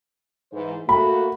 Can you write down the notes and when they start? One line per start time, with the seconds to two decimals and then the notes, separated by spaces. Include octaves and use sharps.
0.53 G#2 E3 C5
0.89 A3 A#3 F#4 B5